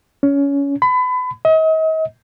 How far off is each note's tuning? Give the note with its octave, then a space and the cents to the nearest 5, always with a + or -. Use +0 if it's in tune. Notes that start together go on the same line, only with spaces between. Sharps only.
C#4 +20
B5 +30
D#5 +40